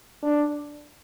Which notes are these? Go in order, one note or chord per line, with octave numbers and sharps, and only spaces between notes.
D4